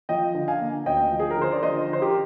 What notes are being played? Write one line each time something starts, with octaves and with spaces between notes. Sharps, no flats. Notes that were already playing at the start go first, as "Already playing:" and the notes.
F3 D#5 G5
D3
F5 G#5
A#3
D2 D#5 G5
F3
G#4
A#4
D3 C5
D5
F3 C5 D#5
D3 C5
G4 A#4